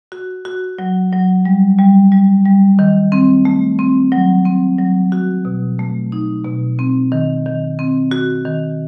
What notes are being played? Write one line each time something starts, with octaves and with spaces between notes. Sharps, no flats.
F#4
F#4
F#3
F#3
G3
G3
G3
G3
D#3
C4
A3
C4
F#3
C4
F#3
F#4
B2
A3
D#4
B2
C4
D#3
D#3
C4
F#4
D#3